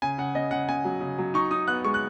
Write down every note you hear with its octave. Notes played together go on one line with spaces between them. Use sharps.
C#3 G#5
C#3 F#5
C#3 D#5
C#3 F#5
C#3 G#5
F#3
C#3
F#3
D#4 C#6
D#4 D#6
B3 F#6
G#3 C#6
F#6